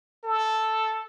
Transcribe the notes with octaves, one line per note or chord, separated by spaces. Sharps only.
A4